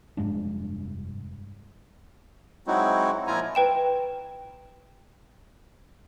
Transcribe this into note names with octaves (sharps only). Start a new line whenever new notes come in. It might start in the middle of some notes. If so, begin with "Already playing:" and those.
F1 G2 G#3 D4
F#3 G#3 C4 D#4 E4 F#4
A#2 F3 E4 F4 G#5 A#5
B4 G5 E7